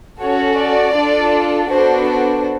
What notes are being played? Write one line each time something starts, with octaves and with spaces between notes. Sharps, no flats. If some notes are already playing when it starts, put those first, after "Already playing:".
C#4 F#4 A4 C#5
D5
D4 F4 A4
B3 D4 F#4 A4 C5
C5